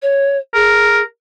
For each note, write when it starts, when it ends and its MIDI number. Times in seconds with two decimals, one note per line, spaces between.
0.02 0.37 73
0.54 1.02 68
0.54 1.00 70